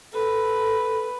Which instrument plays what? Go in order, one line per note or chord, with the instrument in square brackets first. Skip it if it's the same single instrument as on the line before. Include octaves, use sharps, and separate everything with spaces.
[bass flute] A4 [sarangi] B4